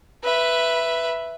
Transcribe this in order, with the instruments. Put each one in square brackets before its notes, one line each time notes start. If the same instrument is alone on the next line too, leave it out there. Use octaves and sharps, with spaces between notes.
[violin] B4 E5